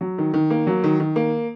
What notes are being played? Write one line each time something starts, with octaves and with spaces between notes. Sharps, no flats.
F#3
D#3
D#3
A#3
F#3
D#3
D#3
A#3